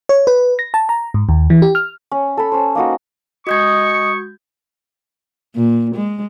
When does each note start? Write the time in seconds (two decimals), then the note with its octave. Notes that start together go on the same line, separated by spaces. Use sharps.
0.09 C#5
0.27 B4
0.59 A#6
0.74 A5
0.89 A#5
1.14 G#2
1.29 D#2
1.50 E3
1.62 G4
1.75 F6
2.12 C#4
2.37 A4 B5
2.52 C#4 C5
2.75 A#3 D#4 F#4
3.47 G#3 F#4 D#5 C#6 D#6 G6 G#6
5.55 A#2
5.95 G#3